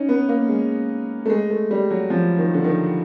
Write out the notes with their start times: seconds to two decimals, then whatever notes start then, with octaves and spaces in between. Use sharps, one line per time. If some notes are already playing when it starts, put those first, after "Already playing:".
Already playing: C#4 D#4
0.09 B3
0.29 A#3
0.49 G#3
1.26 A3
1.30 G#3
1.50 A3
1.71 G3
1.90 F#3
2.10 F3
2.38 D#3
2.54 D3
2.64 D#3